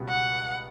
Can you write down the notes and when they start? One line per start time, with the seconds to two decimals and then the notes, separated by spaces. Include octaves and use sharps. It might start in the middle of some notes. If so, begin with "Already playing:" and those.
Already playing: C#2 B2 G3 B3
0.09 F#5